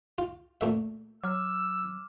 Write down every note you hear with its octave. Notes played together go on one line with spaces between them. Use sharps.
F4
A#2 A3 E5
F#3 D6 E6 F6